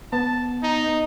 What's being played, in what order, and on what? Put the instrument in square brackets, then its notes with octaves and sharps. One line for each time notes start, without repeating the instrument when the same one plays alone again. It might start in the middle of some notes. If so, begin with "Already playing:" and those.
[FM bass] B3 [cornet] A5
[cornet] D#4